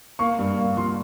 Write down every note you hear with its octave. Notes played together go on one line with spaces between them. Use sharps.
A#3 C#6
G2
A#3
F3 C6